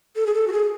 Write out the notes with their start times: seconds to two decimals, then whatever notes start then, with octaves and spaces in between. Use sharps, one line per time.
0.16 A4
0.26 G#4
0.34 A4
0.47 F#4
0.52 G#4